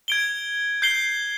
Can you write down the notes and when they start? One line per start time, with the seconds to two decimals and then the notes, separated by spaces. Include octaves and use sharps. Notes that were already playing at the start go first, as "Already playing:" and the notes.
0.08 G#6 D7 G7
0.82 G6 C7 G7